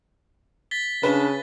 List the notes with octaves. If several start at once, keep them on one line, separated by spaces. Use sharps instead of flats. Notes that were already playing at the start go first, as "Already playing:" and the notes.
A6 B6 G7
C#3 D4 B4